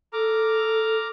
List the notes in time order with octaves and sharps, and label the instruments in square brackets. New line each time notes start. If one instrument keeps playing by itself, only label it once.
[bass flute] A4 [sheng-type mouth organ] A#5 D6 F6